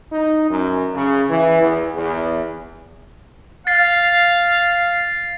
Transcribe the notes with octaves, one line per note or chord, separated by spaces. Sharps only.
D#4
F#2
C#3
E3
E2
E2
F5 A6 C7